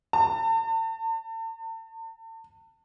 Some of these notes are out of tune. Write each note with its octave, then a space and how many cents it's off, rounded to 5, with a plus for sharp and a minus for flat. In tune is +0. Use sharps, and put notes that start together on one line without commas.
A5 +40